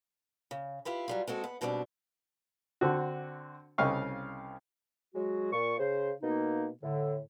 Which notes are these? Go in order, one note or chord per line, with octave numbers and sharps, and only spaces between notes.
C#3
E4 F4 G4 B4
F#3 G3 F4
G#3 C4 F#4 A4
B3
G#2 B2 G3 B3 C4 D4
D3 C4 F#4
C2 C#3 D#5 F5 G5 C#6
F#3 G#3 F#4
A#2 C#6
C#3 C5
B2 A#3 D#4
A2 D3